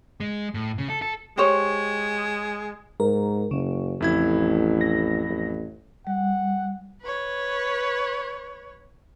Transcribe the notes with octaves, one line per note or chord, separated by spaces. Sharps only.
G#3
A2
C#3
A4
A4
G#3 G4 C5 C#5
G#2 A#4
F#1 C#3
A1 F2 E4 G#6
A#6
A1
G3 F#5
B4 C#5